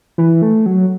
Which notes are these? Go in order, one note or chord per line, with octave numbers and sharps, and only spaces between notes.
E3
A3
F#3